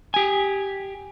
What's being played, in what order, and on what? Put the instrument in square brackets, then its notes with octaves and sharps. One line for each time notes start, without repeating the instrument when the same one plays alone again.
[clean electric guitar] G4 G#5